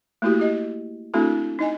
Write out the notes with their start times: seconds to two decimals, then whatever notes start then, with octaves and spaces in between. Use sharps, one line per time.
0.22 A3 A#3 E4 F#4 G4
0.39 G4 D#5
1.14 A3 C4 D4 E4 F#4 A4
1.59 D#4 D#5 G#5